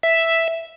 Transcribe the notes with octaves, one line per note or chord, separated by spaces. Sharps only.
E5